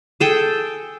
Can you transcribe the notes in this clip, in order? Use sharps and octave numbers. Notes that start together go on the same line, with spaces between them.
G#4 A4 G5